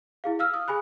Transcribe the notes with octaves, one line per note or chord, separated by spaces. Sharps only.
E4 G#4 F5
F5 E6 F6
D#6
G#4 G#5 B5 F#6